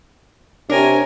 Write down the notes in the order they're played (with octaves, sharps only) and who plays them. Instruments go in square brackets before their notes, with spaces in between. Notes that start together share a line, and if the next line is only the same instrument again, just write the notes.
[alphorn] C3 [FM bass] D4 [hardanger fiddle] A#4 G#5 [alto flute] C#5